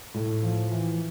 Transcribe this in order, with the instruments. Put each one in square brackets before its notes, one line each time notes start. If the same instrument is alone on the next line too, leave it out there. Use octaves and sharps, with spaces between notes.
[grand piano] A2
F3
E3